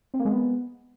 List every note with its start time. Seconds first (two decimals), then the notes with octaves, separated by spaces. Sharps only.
0.14 C4
0.19 A#3
0.25 G#3
0.31 B3